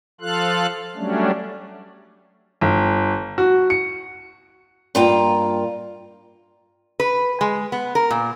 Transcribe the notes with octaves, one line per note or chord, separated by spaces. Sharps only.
F3 F4 A4 F5 F#6
F#3 G3 A3 C#4 D4
G1
F#4
C#7
G2 A#3 F4 A#4 G5 A#5
B4
G#3
B3
A#4
A#2